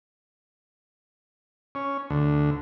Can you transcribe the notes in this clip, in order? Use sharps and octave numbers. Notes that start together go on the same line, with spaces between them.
C#4
D2